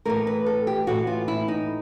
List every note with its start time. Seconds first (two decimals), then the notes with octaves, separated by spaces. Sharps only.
0.05 A2 E3 A3 A#4
0.27 B4
0.46 A4
0.67 G4
0.87 A2 E3 A3 F#4
1.07 F4
1.28 E4
1.48 D#4